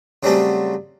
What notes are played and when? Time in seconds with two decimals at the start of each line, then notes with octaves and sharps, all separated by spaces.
0.23 C#3 F#3 G3 A3 C4 C#4